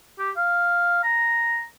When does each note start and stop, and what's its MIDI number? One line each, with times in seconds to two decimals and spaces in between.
0.19 0.30 67
0.36 1.02 77
1.03 1.64 82